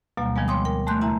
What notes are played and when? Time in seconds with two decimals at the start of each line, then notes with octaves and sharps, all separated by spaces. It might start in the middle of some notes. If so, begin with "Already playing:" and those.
0.17 D2 B2 F#3 G3 A#3
0.36 D#3 F3 G3 G#3 B3
0.48 C#5 G5 C6 D6 D#6
0.65 A#4 G5
0.86 G#3 A3 C6 F#6 G6
1.01 E2 C#3 E4 E5 A5 A#5